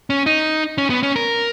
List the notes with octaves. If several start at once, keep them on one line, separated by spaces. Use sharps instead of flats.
C#4
D#4
C#4
B3
C#4
A#4